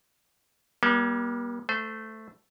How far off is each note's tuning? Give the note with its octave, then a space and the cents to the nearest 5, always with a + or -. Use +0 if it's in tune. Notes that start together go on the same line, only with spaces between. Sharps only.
G3 +0 A#3 +45
A3 +0 C5 -25